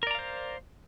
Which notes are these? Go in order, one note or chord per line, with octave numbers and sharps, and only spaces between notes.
A#4 C5 D5 F5 A#5